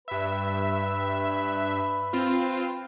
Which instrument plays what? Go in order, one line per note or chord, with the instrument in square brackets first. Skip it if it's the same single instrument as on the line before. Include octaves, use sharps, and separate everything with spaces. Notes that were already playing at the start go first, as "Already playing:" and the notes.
[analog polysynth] G2 E5 [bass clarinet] B4
[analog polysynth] C4 F4